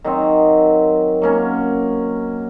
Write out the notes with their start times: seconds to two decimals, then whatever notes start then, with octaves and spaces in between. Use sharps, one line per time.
0.04 D#3 F#3 C4
1.22 F#3 A#3 C#4